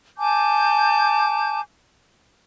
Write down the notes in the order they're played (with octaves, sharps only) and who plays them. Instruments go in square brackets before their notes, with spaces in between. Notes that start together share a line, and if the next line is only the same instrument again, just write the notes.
[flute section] G#5 A5 D6 G6